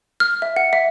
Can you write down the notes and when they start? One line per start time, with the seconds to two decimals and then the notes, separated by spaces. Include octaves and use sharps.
0.20 F6
0.42 E5
0.56 F#5
0.73 E5